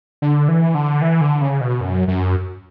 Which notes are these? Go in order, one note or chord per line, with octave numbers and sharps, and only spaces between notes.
D3
E3
D3
E3
D3
C#3
B2
F#2
F#2